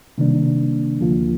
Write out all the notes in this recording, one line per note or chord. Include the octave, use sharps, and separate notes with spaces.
C3 D#3 G3 A#3 D4
D2 D3 F3 A#3 F4